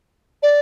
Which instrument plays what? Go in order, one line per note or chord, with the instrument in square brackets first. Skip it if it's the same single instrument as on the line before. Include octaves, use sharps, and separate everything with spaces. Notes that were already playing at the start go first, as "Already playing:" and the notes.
[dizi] D5